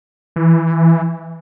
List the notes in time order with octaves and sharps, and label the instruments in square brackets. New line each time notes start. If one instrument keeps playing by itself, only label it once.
[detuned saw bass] E3